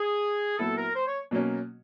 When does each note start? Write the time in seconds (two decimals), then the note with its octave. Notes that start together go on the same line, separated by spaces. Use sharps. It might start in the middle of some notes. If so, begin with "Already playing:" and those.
Already playing: G#4
0.58 A#2 F#3 B3 E4 A4
0.76 A#4
0.95 C5
1.07 C#5
1.31 B2 F#3 A#3 C#4